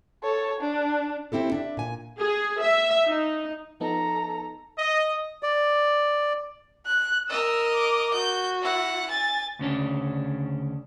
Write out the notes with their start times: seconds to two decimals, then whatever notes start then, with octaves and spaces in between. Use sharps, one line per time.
0.23 A4 C#5
0.60 D4
1.32 C4 E4 G4 A4
1.52 D4 E5
1.77 A#2 G#5
2.19 G#4
2.61 E5
3.06 D#4
3.80 F3 B3 D#4 A4 A#5
4.79 D#5
5.43 D5
6.86 F#6
7.29 A#4 D#5 E6
7.74 D6
8.13 F#4 G6
8.62 E4 F#5
9.10 G#5 A6
9.59 D2 C#3 C#4 D4